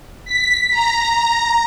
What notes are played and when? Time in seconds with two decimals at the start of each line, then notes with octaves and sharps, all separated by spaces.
0.25 B6
0.70 A#5